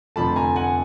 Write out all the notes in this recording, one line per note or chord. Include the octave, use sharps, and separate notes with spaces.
F1 F2 D3 F3 A3 A5 B5
G#5 A#5
F#5 G#5